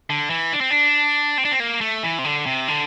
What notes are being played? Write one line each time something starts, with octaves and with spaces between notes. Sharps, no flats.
D3
E3
D4
C4
D4
C4
D4
C4
A#3
A3
E3
C3
D3
C3
D3